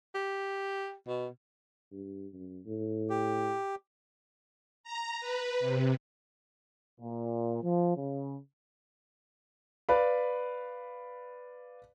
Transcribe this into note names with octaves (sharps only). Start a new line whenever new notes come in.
G4
B2
G2
F#2
A2
G4
A#5
B4
C3
A#2
F3
C#3
B4 D5 F5 B5